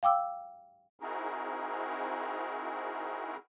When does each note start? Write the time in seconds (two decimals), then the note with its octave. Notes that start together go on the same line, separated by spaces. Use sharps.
0.03 F5 G5 D6 E6
1.00 C4 D#4 E4 F#4 G#4 A#4